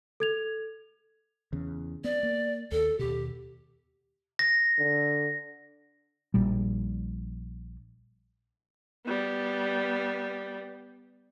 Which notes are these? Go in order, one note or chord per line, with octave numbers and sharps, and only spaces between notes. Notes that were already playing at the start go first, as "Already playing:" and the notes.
A4 G#6 F7
E2 C#3
B3 D5
A#3
D#2 A4
D#2 B2 G4
A#6
D3
A#1 A#2 G3
G3 B3